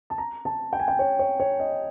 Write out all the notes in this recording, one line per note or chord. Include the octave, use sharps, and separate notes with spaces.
A5
A#5
A5
G5
G#5
G5
C#5
C#5
C#5
D#5